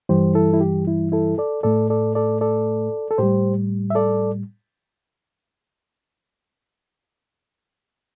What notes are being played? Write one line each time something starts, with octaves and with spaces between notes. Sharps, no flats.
G2 E3 G3 G4 C5
E4 A4
E4
G4
E4
E4 A4
A4 D5
A2 A3 A4 D5
A4 D5
A4 D5
A4 D5
A4
A2 G3 G4 C5
E5
A4 D5